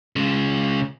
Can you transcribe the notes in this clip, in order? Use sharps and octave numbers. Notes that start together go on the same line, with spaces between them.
C#3 G#3